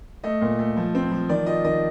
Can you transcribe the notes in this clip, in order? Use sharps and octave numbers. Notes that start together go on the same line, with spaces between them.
A3 D#5
A#2
A3
F3
C4
F3
D#3 D5
F4 D#5
D#3 D#5